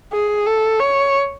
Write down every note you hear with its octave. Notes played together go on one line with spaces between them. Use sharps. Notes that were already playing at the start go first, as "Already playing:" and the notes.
G#4
A4
C#5